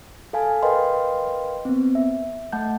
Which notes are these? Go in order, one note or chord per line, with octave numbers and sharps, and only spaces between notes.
A4 F5 G#5 A5
A#4 B4 D#5 F5 G5 C6
B3 C4
E5
A3 F#5 A5 G6